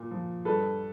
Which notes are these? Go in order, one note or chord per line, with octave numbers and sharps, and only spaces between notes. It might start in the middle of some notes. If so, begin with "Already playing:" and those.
Already playing: A#2
F3
G2 A4 B4